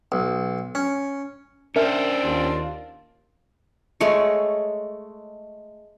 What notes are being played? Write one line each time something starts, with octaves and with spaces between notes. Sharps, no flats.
B1
C#4
C#4 D4 A#4 C5 E5 F6
D#2 F4
G#3 A3 C#5